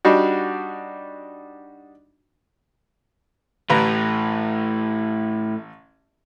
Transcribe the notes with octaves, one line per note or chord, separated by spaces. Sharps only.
G3 D4 D#4 F#4
A1 A2 B4 A#5